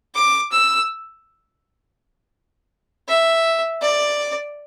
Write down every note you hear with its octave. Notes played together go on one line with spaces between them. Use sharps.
D6
E6
E5
D5